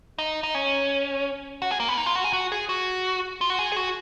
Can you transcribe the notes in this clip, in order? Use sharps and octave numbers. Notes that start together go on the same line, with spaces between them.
D#4
D#4
C#4
F#4
G#4
A#3
B3
D#4
F4
F#4
G#4
F#4
G#4
F#4
F4
F#4
G#4
G#4
F#4